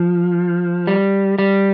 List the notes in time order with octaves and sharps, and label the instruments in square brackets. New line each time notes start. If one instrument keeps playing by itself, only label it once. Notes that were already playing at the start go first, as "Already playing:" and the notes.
Already playing: [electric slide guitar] F3
G3
G3